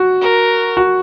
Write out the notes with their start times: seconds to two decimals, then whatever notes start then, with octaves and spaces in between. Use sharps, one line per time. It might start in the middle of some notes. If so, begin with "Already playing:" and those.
Already playing: F#4
0.21 A#4
0.77 F#4